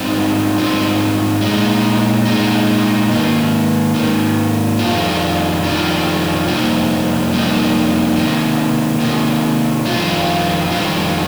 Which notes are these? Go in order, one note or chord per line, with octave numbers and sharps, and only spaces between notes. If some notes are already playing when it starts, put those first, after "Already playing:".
Already playing: G#2 G3 C4 D#4
G#2 G3 C4 D#4
A#2 G#3 D#4
A#2 G#3 D#4
G#2 D#3 A#3
G#2 D#3 A#3
F2 D#3 G3 D4 F4
F2 D#3 G3 D4 F4
F2 C3 G3 A#3 D#4
F2 C3 G3 A#3 D#4
C3 D#3 A#3
C3 D#3 A#3
F2 D#3 G3 D4 F4
F2 D#3 G3 D4 F4